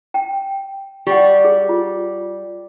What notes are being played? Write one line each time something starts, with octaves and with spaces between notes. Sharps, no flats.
G5
G3 G4 F#5
G#4
F4